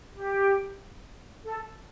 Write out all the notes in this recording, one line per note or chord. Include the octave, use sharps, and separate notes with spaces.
G4
A4